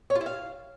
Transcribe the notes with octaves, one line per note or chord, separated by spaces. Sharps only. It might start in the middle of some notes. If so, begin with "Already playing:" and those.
C#5
F4
E4
F5